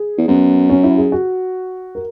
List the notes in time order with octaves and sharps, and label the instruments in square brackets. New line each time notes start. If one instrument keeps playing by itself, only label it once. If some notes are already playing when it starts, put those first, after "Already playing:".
Already playing: [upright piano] G#4
[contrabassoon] E2
[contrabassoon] F#2 [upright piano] B3
[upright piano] C#4
E4
G#4
F#4
A#4